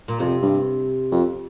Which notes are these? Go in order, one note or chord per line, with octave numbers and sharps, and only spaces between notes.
A#2
F2 C3
G2
F2